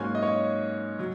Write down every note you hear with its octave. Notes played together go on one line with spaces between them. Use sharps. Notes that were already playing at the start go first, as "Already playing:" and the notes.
Already playing: G#2 F#3 A#3 C#4 G#5
D#5
C#5
F#3